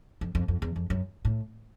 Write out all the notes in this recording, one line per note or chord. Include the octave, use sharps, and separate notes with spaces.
F2
F2
F2
E2
F2
F#2
A2